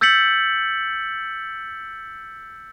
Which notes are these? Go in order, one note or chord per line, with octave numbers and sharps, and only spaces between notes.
E6 G6 A6 B6 C#7 F#7